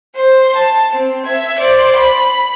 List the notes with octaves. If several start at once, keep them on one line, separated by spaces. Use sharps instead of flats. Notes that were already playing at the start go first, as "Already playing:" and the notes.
C5
A5
C4
E5 G#6
C5 D5
B5